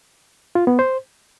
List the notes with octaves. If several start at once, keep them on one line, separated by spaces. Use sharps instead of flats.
F4
B3
C5